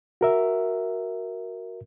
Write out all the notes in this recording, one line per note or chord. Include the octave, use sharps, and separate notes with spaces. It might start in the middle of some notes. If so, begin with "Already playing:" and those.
F#4 A#4 E5